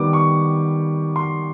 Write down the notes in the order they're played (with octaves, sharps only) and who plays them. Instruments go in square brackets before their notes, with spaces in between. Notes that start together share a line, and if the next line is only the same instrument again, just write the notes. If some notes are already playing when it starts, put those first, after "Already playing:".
Already playing: [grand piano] D#3 G3 B3 D6
C#6
C6